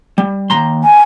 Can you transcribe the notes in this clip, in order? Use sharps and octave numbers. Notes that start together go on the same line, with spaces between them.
G3
D#2 A#5 C6
G#5